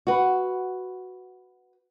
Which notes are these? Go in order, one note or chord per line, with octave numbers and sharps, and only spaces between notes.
F#4 B4